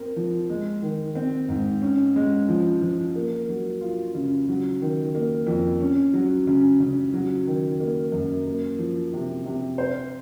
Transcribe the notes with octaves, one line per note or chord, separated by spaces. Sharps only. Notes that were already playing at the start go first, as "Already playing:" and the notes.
Already playing: C4 A#4
F3
G#3
D#3
C4
G#2
C#4
G#3
F3
F3
A#3
F#3
F4
C#3
F#3
D#3
A#3
F2
C#4
F#3
C#3
C#3
F#3
D#3
A#3
F#2
A#3
F3
C3
C3
C5